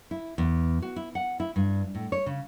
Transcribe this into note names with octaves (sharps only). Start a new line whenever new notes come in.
E4
E2
F#4
E4
F#5
E4
G2
A2
C#5
C#3